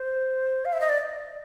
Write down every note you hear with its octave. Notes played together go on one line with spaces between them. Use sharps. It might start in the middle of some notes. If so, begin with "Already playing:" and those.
Already playing: C5
F5
E5
D#5
D5